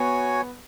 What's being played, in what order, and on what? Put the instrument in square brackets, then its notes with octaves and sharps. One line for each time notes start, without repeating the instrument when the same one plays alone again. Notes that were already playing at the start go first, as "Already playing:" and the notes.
Already playing: [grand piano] B3 [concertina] F#4 C#5 G#5